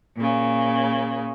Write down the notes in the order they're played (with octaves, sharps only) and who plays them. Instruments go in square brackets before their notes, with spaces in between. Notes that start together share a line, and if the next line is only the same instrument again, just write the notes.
[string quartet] A#2 C#3